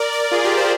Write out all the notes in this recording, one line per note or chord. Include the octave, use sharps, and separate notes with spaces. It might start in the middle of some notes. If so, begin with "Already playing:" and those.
Already playing: A#4 D5
A#4 D5
F4 G#4
G4 A#4
G#4 C5